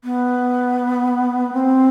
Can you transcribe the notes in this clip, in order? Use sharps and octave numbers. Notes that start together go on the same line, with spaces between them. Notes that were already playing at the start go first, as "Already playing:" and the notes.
B3
C4